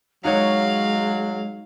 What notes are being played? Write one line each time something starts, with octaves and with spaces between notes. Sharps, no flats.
F#3 G#3 D#4 F#4 C#5 F5